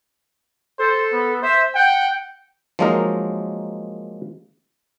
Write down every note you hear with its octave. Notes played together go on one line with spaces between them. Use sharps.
A4 C5
B3
C5 E5
F#5 G5
F3 F#3 G#3 A#3 D#4 A#4